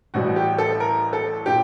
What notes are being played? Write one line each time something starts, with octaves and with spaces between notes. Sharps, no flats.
A1 A2 G3 F#4
G4
A4
A#4
A4
A#2 G4